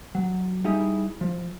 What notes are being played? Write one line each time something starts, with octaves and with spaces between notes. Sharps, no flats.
F#3
G3 D#4 E4 G4 G#4
F3